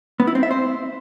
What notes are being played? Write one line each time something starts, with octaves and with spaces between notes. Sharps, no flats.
B3
E4
C4
E5
C5